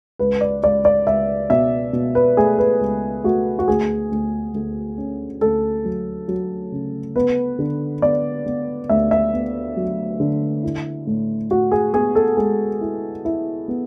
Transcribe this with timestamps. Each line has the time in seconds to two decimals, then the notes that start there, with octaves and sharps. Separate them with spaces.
0.19 C#2 B4
0.41 D5
0.63 C#2 D5
0.85 D5
1.06 C#2 E5
1.50 B2 E5
1.93 B2
2.15 B4
2.37 A3 G#4
2.58 B4
2.80 C#2
3.24 A3 F#4
3.59 F#4
3.68 D2 G#4
4.11 D2
4.54 D2
4.98 C#4
5.41 D2 A4
5.85 F#3
6.28 F#3
6.72 C#3
7.16 B3 B4
7.59 D3
8.02 B3 D5
8.46 B3
8.89 D2 E5
9.11 E5
9.33 B3
9.77 F#3
10.20 D3
10.63 E4
11.07 A2
11.50 A2 F#4
11.72 G#4
11.94 B3 G#4
12.15 A4
12.37 G#3 G#4
12.81 E4
13.25 E4
13.68 B3